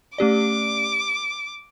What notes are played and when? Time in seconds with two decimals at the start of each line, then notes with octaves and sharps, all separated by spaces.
0.18 A3 C#4 G4 D5 D6